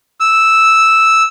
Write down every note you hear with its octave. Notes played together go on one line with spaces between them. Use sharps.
E6